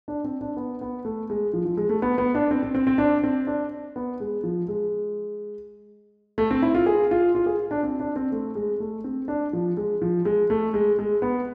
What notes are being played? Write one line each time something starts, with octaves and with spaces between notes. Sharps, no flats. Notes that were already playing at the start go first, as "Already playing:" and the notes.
D4
C4
D4
B3
B3
A3
G#3
F3
F3
G#3
A3
B3
B3
D4
C4
C4
C4
C4
D4
C4
D4
B3
G#3
F3
G#3
A3
C4
E4
F4
G#4
F4
F4
G#4
D4
C4
D4
C4
A3
G#3
A3
C4
D4
F3
G#3
F3
G#3
A3
G#3
G#3
B3